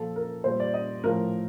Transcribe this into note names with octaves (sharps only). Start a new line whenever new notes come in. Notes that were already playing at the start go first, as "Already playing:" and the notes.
Already playing: A#2 F3 A4
A#4
A#2 G3 C5
D5
D#5
A2 F3 A#4